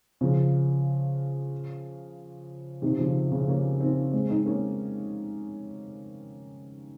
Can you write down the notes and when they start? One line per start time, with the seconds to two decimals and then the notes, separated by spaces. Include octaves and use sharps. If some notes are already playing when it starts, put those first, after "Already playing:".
0.21 C#3 F3
2.82 C3 D#3
2.98 C#3 F3
3.32 C#3 F3
3.48 A#3 C#4
3.80 C4 D#4
4.13 G#3 C4
4.29 C4 D#4
4.46 A#3 C#4